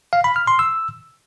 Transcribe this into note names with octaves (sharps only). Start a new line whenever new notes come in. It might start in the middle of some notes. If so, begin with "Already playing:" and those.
F5
B5
F6
C6
E6